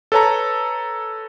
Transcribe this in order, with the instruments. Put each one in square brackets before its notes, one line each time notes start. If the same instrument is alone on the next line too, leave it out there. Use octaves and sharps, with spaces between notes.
[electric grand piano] A4 B4 C#5 A5 A#5